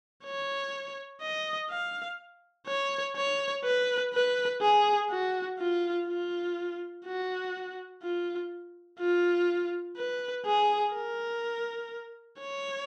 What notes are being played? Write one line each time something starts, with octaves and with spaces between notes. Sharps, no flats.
C#5
D#5
F5
C#5
C#5
B4
B4
G#4
F#4
F4
F4
F#4
F4
F4
B4
G#4
A#4
C#5